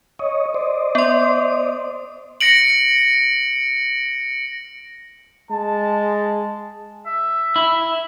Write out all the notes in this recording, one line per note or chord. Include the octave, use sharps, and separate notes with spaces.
C#5 D#5
C5 D5 D#5
B3 C6
A#6 C#7 D7 F#7
G#3 A5
E5
E4